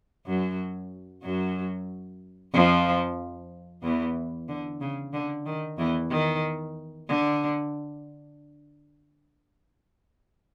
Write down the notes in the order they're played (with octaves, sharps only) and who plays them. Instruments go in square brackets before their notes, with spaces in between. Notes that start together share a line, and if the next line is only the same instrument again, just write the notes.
[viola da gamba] F#2 F#3
F#2 F#3
F2 F3
E2 E3
D3
C#3
D3
D#3
E2 E3
D#3
D3